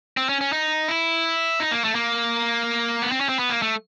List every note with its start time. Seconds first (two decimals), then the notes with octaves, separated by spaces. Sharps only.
0.17 C4
0.29 C#4
0.41 C#4
0.53 D#4
0.88 E4
1.60 D#4
1.72 A#3
1.84 A3
1.95 A#3
3.02 B3
3.12 C4
3.21 C#4
3.29 C4
3.39 B3
3.50 A#3
3.62 A3